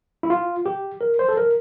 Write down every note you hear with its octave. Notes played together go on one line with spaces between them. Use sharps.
E4
F4
G4
A#4
C5
A4
A#4